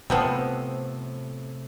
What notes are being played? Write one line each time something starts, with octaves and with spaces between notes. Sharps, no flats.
A2 C3 F3 B3 C4